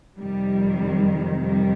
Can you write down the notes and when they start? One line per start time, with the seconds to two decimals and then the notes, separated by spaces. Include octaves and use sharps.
0.18 F2 C3 D#3 G3
1.43 G3